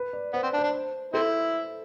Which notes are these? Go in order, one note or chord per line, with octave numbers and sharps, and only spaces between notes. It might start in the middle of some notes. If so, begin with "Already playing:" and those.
Already playing: B4
D5
B3 C5
C4 D5
D4
C5
D4
C4 E4 A4